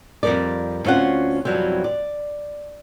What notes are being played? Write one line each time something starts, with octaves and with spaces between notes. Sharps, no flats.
F2 B2 G3 A#4 D5
D2 C4 C#4 F4 F#5
F2 B2 E3 F#3 G3 C4
D5